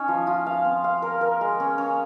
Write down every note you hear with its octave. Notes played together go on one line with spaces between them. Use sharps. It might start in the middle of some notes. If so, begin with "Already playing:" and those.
Already playing: C#4 D#4
F3
F4
F5
C4
F5
A#4
A#4
G#3
C#4
C#4